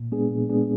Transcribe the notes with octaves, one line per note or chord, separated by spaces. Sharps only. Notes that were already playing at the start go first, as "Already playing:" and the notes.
Already playing: A#2
G#3 B3 D4 G#4
A#2
G#3 B3 D4 G#4